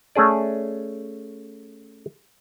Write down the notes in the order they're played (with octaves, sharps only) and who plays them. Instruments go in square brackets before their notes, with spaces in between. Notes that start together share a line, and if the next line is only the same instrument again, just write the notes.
[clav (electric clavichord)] A3 C#4 G#4 D5